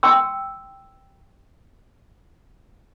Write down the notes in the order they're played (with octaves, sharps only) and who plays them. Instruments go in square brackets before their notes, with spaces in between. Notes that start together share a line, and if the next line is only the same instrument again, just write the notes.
[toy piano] G5 C6 E6